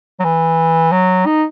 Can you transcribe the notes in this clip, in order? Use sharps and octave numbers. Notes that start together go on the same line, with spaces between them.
F#3
E3
F#3
D#4